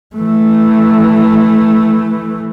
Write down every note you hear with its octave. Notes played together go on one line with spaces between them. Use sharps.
E3 A3